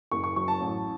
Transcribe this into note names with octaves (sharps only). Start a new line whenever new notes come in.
F#1 C#6
C#6
F#3 C#6
A5
A1